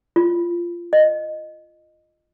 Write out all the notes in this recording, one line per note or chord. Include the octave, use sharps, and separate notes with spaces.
F4
D#5